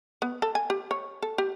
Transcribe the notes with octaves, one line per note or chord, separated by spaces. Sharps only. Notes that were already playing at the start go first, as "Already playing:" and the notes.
B3
A4
G#5
G4
C#5
A4
G4